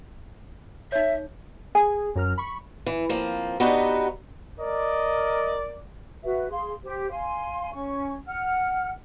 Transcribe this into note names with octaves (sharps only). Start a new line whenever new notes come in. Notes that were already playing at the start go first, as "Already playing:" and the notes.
D#4 C#5 E5
G#4 G#5
F#2 A#4 F6
B5 C#6
E3
F3 A#3 C4
B3 D4 D#4 F#4 G4 B4
A#4 D5 D#5
F#4 B4 E5
G#4 F5 C6
G4 C5
F5 G#5 C6
C#4 C#6
F#5 F6